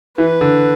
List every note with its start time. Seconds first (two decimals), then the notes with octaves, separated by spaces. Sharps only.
0.18 E3 B4
0.41 D3